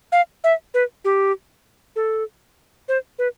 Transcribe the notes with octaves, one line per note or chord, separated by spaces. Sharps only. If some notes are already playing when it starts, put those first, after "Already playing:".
F5
E5
B4
G4
A4
C5
B4